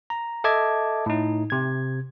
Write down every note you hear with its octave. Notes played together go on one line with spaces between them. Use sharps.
A#5
A4 D#5 E5 A5 D6 G#6
A2 D#4
C3 G#6